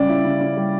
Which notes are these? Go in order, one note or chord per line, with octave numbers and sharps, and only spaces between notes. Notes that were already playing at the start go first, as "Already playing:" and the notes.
Already playing: C#3 G3 C#4 D5
E4
C#3
C#4
G3